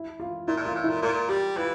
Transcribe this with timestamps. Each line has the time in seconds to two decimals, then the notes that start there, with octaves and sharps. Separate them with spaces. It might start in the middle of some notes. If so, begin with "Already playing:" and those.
Already playing: E4
0.20 F4
0.47 A#2 E4
0.57 A2
0.61 A#2 F4
0.75 A2
0.84 E4
0.89 A#2
1.02 A#2 F4
1.29 G3 G4
1.56 E3 F4